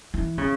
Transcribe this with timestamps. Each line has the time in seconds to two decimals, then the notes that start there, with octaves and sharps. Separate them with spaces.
0.14 E3
0.38 C#3